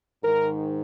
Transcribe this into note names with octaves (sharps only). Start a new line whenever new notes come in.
G#2 D#3 A#4